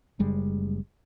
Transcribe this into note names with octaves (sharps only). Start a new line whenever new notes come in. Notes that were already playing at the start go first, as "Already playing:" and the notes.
F#1 G3 G#3